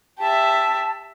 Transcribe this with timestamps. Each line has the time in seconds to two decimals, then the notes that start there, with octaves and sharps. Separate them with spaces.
0.19 G4 E5 A5